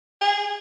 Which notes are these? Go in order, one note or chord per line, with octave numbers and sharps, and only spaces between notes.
G#4